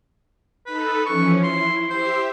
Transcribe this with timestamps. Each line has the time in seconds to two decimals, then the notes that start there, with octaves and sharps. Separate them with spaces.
0.67 D#4 A4 B4
1.06 E3 F3 C#4 C#6
1.43 E4 C6
1.90 G4 C5 E5